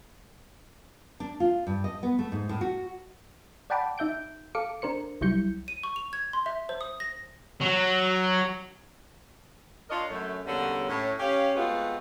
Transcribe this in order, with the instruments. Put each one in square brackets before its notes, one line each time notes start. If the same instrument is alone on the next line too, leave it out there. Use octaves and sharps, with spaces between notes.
[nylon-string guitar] D4
F4
G2
D#5
B3
A3
G#2
A2
F#4
[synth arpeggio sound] D5 F#5 G5 A5 B5 D6
D#4 E5 G6 D7
A4 F5 D6 C#7
D4 A#4 C5 C#7
C2 F#3 G3 E4 G6 C#7
[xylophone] D#7
C#6
F7
G#6
C6
E5
C5
D#6
A#6
[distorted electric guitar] F#3
[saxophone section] D4 F4 A#4 C#5 D#5
F#2 A3
E2 D3 G3 A#3 C#4 C#5
A2 C#4
C#4 G4 F5
G#3 A3 B3 C4 F4 F#4